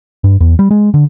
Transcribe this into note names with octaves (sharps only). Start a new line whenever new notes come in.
G2
E2
G3
G#3
D3